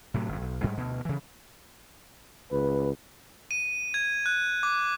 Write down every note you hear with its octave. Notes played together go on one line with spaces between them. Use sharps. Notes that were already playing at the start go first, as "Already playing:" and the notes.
A2 C3 F#3
G1 F2
B1
G#2 G3 G#3
D2 B2
C#3 E3
C#2 B4
D#7
G#6
F#6
D6